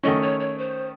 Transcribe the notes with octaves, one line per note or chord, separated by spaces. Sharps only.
D#3 A3 C#4 D#5
C#5
C#5
C5